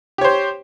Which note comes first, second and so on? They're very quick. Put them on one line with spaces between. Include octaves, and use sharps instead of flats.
G4 C#5 C5